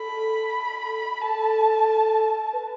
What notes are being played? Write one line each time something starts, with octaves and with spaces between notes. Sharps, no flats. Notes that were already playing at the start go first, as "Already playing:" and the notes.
Already playing: A4 B5
A4 A5
B4